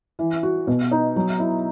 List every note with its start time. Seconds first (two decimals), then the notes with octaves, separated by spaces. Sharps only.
0.19 E3
0.43 F#4
0.67 B2
0.91 D#4
1.16 F#3
1.40 E4